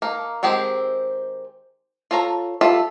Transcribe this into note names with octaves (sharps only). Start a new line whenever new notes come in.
A#3 D#4
D#3 G#3 C4 G4 G#4
F4 A4 C#5 A#5
G3 F4 A4 E5